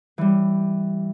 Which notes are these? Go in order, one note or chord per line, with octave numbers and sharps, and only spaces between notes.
E3 G3